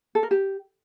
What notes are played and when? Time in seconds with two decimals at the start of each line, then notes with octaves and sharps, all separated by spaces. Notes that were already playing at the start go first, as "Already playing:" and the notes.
0.15 A4
0.23 A#4
0.31 G4